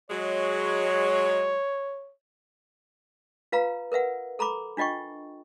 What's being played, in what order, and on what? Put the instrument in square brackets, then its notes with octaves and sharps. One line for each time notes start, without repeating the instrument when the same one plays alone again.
[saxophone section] F#3 G#3 [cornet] C#5
[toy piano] F4 B4 F5 A#5
A#4 B4 E5 F#5
A4 A#5 B5 D6
D4 F4 D#5 G5 C#6